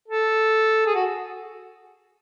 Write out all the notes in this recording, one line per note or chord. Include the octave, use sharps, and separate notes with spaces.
A4
G#4
F#4